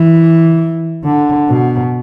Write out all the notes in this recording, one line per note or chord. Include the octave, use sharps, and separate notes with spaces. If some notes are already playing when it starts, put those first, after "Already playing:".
Already playing: E3
D3
B2